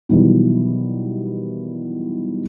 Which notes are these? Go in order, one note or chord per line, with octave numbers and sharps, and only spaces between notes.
B2 D#3 E3 F#3 G3